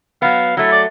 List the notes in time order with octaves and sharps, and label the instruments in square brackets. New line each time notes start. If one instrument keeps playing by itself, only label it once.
[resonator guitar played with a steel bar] F#3 B3 [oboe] F5
[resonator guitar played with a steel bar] F#3 A3 [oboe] E4
[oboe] D5